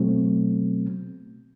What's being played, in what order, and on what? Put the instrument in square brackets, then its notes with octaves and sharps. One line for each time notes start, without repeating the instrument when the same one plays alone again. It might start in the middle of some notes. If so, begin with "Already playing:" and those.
Already playing: [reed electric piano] B2 F#3 A3 C4